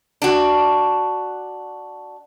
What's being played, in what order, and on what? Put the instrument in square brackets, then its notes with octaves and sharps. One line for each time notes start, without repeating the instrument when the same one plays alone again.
[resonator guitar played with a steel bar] D4 F#4